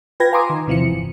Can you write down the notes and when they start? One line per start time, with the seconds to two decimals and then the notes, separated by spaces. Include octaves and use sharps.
0.20 F4 B4 G5 G#6 A#6
0.32 F5 G#5 A#5 C6 D6 D#6
0.50 D#3
0.67 E2 C3 E3 F3 C#7
0.89 G1